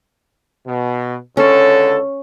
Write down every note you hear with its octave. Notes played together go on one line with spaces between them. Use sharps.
B2
C#2 D3 C#4 A4